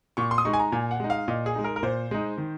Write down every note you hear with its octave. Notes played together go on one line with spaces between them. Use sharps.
A#2 C#6
C6
D#6
G#3 D#4 C#6
G#5
A#5
A#2 G#5
F#5
G#3 D#4
F5
A#2 D#5
G#4
G#3 D#4
A#4
A#4
A#2 C5
G#3 D#4
D#3